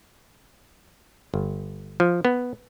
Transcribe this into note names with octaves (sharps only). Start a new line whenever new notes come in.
G1
F3
B3